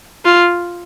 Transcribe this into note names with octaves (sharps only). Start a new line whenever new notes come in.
F4